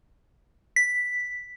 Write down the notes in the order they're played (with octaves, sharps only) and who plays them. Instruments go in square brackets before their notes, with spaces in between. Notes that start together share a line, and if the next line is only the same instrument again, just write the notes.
[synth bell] B6